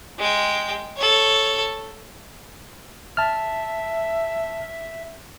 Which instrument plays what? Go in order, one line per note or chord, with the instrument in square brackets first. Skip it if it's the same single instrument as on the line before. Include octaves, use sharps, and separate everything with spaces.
[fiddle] G#3 G5
A4 C#5
[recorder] E5 [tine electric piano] A5 F6